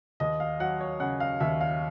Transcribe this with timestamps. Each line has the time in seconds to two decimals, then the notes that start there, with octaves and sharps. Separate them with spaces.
0.20 D#2 D#5
0.40 F5
0.60 F#3 F#5
0.81 C#5
1.00 C#3 F#5
1.20 F5
1.40 D#2 E5
1.61 F5